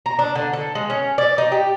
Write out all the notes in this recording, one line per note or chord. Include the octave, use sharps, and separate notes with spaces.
A#5
D4
D3
A4
G#3
C#4
D5
D#4
G4